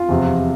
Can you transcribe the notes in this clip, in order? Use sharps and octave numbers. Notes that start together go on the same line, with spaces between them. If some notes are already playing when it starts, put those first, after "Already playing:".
Already playing: F4
E2 C3 F3